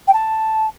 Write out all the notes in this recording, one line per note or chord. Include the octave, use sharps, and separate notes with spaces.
G5
A5